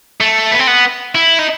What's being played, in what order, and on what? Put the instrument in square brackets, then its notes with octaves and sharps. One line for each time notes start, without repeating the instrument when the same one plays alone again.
[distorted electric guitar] A3
B3
C4
B3
E4
D#4